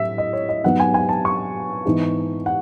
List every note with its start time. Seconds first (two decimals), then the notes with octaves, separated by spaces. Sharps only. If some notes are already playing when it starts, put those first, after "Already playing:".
Already playing: A2 F#3 E5
0.18 D#5
0.33 C#5
0.49 D#5
0.64 G#2 F#3 B3 D#4 F#5
0.80 G#5
0.94 G#5
1.09 A5
1.25 C#6
1.86 G#2 E3 B3 D#4
2.46 F#5